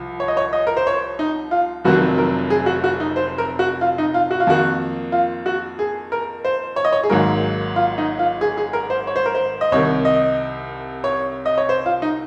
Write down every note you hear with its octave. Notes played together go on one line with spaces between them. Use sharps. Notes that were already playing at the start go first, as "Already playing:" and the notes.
Already playing: C2 F3
C#5
D#5
C#5
D#5
A#4
C5
C#5
D#4
F4
F1 F2 C3 D#3 F#3 F#4
A#4
G#4
F#4
F#4
D#4
C5
A#4
F#4
F4
D#4
F4
F#4
F4
F2 D#3 A#3 F#4
F4
F#4
G#4
A#4
C5
C#5
D#5
C#5
G#4
G#1 G#2 F#3 A#3 A#4
F4
D#4
F4
G#4
G#4
A#4
C5
C#5
C5
A#4
C5
D#5
C2 C3 D#3 C#5
D#5
C#5
D#5
C#5
C5
F4
D#4